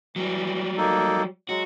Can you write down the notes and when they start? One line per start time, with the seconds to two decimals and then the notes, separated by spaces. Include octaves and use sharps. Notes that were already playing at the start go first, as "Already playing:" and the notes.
0.16 E3 F#3 G3
0.77 A#3 D#4 A4
1.49 F#3 G#3 F#4